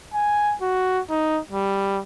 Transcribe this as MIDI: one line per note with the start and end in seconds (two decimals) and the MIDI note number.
0.14 0.55 80
0.62 1.01 66
1.10 1.40 63
1.51 2.00 55